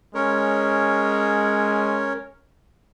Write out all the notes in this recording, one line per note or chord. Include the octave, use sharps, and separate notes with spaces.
G#3 C#4 A#4 C#5